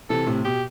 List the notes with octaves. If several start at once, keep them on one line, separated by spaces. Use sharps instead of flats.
C3 E3 A4
A2 C3
B2 G4